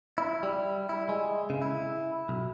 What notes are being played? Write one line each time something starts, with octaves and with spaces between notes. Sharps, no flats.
E4
G3
E4
G#3
C#3
E4
B1